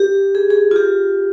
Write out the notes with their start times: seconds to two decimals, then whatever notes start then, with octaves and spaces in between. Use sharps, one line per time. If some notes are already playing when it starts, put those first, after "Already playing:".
Already playing: G4
0.35 G#4
0.50 G#4
0.71 F4
0.76 G4